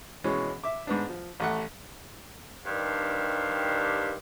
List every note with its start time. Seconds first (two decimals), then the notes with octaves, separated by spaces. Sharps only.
0.24 B2 E3 G#3 C#4
0.64 E5 D6
0.87 G#2 B3 D4
1.09 F3
1.40 A1 A3 F#5
2.66 G2 D#3 D4 G4 C5 F5